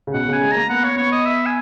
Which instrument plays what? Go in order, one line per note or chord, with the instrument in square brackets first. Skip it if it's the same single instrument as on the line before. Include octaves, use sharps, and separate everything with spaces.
[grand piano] C#3
[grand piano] B2 [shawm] F#5
[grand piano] C#3 [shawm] G#5
[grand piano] G#3
[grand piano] A#3 [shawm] A#5
[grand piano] B3 [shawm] F#5
[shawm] C#5
[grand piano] B3 [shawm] C#5
[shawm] D#5
E5
G#5